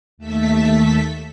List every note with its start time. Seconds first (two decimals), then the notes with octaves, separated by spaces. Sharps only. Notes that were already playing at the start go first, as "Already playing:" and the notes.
0.18 D#2 A3 A4 E5 B6